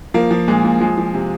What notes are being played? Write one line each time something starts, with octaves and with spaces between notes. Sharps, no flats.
F3 A#3
F3
A#2 G#3
A#2
F3 G#3
F3
C3